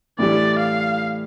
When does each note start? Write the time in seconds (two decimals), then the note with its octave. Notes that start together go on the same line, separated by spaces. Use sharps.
0.19 A2 E3 G3 D5
0.59 F5